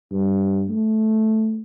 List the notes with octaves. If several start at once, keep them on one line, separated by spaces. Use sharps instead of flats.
G2
A3